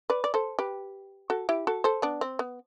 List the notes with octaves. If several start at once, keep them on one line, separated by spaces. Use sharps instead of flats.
B4 D5
D5
A4 C5
G4 B4
F#4 A4
E4 G4
F#4 A4
A4 C5
B3 D4
C4
B3